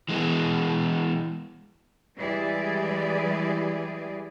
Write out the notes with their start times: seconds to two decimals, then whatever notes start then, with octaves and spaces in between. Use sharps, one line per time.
0.09 E3 G#3 B3
2.17 E3 G3 G#3 G4 G#4 D5